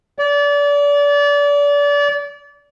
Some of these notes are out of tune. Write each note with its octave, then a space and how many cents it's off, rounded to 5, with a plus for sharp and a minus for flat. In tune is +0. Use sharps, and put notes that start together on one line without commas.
D5 -30